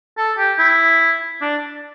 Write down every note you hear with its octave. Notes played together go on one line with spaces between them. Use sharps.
A4
G4
E4
D4